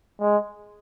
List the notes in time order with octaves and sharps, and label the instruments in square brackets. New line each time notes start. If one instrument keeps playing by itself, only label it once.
[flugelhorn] G#3